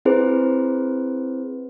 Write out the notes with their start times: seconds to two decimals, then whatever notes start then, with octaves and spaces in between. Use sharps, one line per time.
0.05 C4 E4 G#4 B4 C5